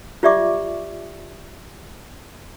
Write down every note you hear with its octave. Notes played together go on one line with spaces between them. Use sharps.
F4 G4 D5 E5 C#6 D6